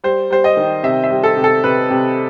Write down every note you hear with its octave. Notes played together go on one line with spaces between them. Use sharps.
G3 C5
G3 C5
D#5
D#3
C3 E5
E5
G3
A4
C3
A4
C3 B4
C3